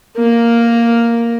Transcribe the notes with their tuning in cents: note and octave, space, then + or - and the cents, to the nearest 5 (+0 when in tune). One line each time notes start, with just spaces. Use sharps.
A#3 +0 A#4 +0